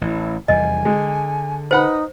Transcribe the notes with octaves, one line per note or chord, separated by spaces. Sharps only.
A1 E4
F1 E2 G3 D#5 G#5
D3 G#3
D#4 B4 C5 F#5 B5